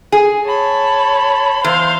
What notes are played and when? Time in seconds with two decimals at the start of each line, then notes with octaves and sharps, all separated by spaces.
0.12 G#4
0.46 C#5 A5 B5
1.64 E2 C5 F5 C6